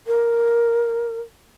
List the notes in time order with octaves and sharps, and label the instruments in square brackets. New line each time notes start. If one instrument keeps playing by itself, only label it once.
[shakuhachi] A#4